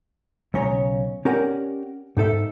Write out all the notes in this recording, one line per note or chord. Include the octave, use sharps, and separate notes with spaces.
B1 C#3 C#4 C#5 A#5
C#4 G4 A#4 D5 F#5
G#2 D#4 A4 E5